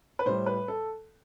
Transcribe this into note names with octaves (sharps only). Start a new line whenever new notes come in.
B4
A2 G3 C5
B4
A4